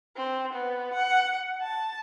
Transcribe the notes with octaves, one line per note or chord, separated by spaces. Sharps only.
C4
B3
F#5
A5